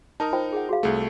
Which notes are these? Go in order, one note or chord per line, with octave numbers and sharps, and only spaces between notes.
D#4 A#4 A5 D#6
F4 C5 G5
G#4 F#5
F#4 G#4 F5
C2 A3 G#4